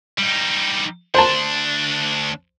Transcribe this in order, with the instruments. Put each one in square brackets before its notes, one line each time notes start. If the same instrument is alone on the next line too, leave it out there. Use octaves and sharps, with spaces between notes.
[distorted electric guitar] G3 D#4
[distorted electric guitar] D2 D4 [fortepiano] C5 A5